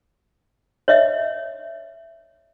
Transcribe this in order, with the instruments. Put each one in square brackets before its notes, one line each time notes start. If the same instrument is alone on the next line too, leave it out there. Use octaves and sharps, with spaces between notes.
[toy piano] C#5 D#5 E5